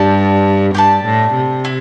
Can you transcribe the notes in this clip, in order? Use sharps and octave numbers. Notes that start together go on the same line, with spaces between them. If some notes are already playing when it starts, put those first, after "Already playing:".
Already playing: G2 G4 D5 A5
G2 G4 D5 A5
A2
C3
E4